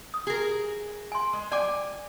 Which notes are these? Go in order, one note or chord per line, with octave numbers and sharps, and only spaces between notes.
D#6
G#4 A#4
G#5 C6
G#3
D5 G5 G#5 D6